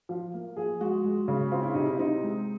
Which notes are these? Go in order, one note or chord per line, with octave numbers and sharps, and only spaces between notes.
F3
A#3
F3 G#4
G#3 F#4
G#3
C#3
C4 F4
E4
C3 D#4
E4
C4 D#4
G#3